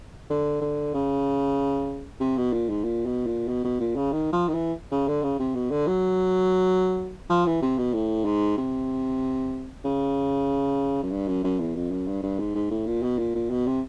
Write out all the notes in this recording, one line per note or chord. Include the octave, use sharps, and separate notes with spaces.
D3
D3
C#3
C3
B2
A#2
G#2
A#2
B2
A#2
B2
B2
A#2
C#3
D#3
F3
D#3
E3
C#3
D3
C#3
C3
B2
D3
F#3
F3
E3
C3
B2
A2
G#2
C3
C#3
F#2
G2
F#2
F#2
E2
F2
F#2
G2
G2
G#2
G#2
A2
A#2
B2
A#2
A#2
B2
C3